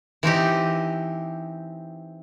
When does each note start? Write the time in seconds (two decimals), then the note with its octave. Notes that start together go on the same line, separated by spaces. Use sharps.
0.23 E3 C4 D#4 G4